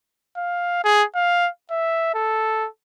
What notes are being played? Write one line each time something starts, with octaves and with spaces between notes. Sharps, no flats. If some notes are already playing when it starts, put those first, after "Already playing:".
F5
G#4
F5
E5
A4